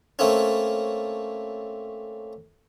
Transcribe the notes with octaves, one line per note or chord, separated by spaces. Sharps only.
A3 A#3 C4 C#4